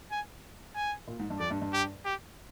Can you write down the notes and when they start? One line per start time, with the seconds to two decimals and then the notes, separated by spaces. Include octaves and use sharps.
0.11 G#5
0.75 G#5
1.07 A#2
1.19 G#2
1.30 G2
1.40 F2 D5
1.51 G2
1.62 G2
1.73 G4
2.05 G4